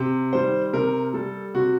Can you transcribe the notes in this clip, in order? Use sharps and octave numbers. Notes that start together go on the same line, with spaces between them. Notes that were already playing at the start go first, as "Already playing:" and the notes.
Already playing: C3
D#3 G3 C5
C3 A#4
G3 A4
C3 F#4